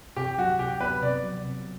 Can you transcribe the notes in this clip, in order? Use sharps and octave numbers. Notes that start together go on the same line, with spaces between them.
C3 G4
F#3 F#4
C3 G4
B3 B4
C3 D5
F#3
C3